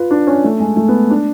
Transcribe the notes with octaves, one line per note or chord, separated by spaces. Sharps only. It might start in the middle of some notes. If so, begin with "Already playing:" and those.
Already playing: F4 B4
D4
C#4
A3
G#3
A3
B3
D4